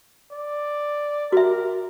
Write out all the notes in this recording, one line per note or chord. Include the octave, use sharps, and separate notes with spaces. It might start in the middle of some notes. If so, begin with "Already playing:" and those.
D5
F#4 A#4 E5